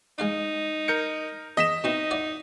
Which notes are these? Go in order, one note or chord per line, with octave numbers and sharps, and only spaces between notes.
G#3 D#4 F5 B5
A#4 G6 C#7
E2 D#5 B6 E7
B2 C4 D#4 E4
E4 D5 F#5